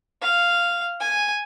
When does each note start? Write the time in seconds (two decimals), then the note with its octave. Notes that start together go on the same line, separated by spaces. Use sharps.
0.22 F5
1.00 G#5